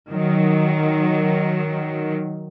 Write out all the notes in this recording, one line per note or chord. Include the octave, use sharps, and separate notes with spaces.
D#3 F#3